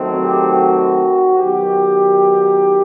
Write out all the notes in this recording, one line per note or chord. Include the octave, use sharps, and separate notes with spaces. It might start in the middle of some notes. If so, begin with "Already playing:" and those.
Already playing: D#3 F#3 A3 C4
G4
F#4
D#3 F#3 B3 G4